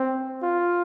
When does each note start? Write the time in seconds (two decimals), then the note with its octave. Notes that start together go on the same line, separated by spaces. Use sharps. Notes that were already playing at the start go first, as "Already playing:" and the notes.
Already playing: C4
0.43 F4